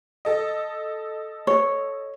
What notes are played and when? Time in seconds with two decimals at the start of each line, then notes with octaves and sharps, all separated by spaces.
0.25 A4 D#5
1.47 C#5